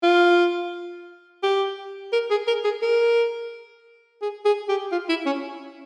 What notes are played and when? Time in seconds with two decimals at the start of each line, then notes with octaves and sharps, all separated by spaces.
0.03 F4
1.43 G4
2.13 A#4
2.30 G#4
2.47 A#4
2.64 G#4
2.82 A#4
4.21 G#4
4.45 G#4
4.69 G4
4.92 F4
5.09 E4
5.26 C#4